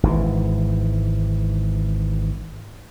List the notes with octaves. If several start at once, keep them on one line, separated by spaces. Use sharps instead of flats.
G#1 G#2 E3